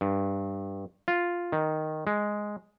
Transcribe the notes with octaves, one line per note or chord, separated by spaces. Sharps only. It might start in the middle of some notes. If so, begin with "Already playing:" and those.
G2
F4
D#3
G#3